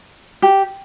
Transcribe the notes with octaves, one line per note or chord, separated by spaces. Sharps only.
G4